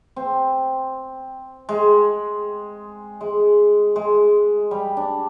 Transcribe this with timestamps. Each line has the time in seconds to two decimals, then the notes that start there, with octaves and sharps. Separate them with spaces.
0.16 C4
1.69 G#3
3.21 G#3
3.96 G#3
4.71 G3
4.97 D4